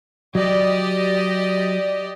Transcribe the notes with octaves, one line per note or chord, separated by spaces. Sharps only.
F#3 G4 D5 D#5